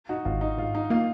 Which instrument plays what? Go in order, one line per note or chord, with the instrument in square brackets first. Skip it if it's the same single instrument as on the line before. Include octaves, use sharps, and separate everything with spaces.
[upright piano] D#4 F#4
[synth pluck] G#1 [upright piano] F4
[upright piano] D#4
[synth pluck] G#2 [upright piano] F4
[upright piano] D#4
[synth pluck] A#3 [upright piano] F4